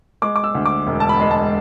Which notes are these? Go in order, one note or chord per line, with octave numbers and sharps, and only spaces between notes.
G#3 D6
D6
E6
D2
D6
E1
A5
B5
G#3
A5